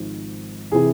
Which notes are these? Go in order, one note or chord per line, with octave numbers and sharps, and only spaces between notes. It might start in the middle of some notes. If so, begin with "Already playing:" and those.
Already playing: G#1 G#2 F3
C3 E3 G#4